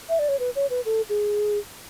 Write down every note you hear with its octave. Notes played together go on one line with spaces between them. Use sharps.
E5
D5
C#5
B4
C#5
B4
A4
G#4